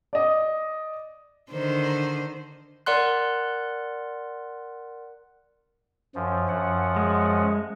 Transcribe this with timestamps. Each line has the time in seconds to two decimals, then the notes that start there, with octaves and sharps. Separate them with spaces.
0.13 D5 D#5
1.51 D3 D#3 C5
2.86 A#4 D5 F#5 C6 F#6
6.15 F#2 F3
6.49 F#2 F3 F#5
6.96 G#3